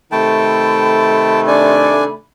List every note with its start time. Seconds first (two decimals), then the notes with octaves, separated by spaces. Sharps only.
0.12 C3 D#3 A3 G5 A5 B5
1.47 D4 D5 G#5